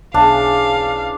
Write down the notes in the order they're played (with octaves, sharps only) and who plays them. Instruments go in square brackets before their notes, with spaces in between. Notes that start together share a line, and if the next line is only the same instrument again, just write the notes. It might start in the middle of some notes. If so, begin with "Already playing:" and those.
[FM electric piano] B1 [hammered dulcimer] C#3 E3 [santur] D4 [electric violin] F5